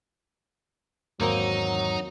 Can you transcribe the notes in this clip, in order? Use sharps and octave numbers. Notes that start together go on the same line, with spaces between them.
E2 G#2 D#3 F#3 A#3 C4 D#4 A#4